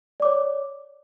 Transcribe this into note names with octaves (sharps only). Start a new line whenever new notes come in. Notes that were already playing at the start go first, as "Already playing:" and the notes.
C#5 D5 D6